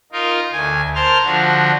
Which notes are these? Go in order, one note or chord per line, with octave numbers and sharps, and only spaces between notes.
D#4 F4 A#4
D2 G#5
A#4 C5 A5 C6 F6
D3 F3 D4 F#4